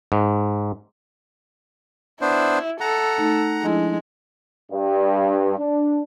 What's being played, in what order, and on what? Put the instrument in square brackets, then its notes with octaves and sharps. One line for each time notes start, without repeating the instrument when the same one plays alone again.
[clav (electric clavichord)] G#2
[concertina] B3 D4 C5 [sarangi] E4
[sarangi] A4 [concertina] F#5 A#5
[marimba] A3 D#4
[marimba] F3 D4 E4 [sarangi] G#3
[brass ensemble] G2
D4